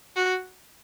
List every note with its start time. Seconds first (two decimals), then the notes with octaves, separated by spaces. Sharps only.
0.16 F#4